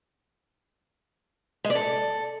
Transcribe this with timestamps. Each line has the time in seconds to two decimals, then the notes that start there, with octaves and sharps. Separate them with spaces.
1.65 G#3
1.70 D5
1.75 A4